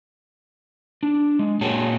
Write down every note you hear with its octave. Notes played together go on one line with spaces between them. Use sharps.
D4
G#3
A#2 F#4 G#4 C#5 G5 A5